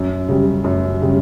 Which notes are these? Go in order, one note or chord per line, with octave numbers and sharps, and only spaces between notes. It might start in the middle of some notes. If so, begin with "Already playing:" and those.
Already playing: F#2
C#3 G3
F#2
C#3 G3